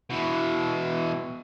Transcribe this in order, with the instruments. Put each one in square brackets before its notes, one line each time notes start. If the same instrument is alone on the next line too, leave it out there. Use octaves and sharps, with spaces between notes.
[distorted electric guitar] B2 E3